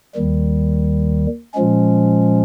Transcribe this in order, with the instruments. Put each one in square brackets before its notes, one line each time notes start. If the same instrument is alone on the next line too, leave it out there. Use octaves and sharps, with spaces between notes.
[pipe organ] D#2 D#3 G3
A#2 F3 G#3 C#4